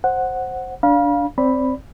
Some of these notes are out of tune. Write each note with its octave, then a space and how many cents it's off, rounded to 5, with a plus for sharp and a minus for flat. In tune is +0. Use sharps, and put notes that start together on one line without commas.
C5 +10 F#5 +0
D4 -15 F5 +5 B5 -40
C4 +0 D5 -20 B5 +0